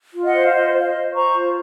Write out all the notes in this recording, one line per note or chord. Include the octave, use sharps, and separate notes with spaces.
F4
D#5 F#5
C5
F5
F4 D#5
C5 F5
D#5
C5
C5 A#5 C#6
F4